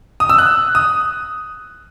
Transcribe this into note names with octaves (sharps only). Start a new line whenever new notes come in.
D#6
E6
F#6
D#6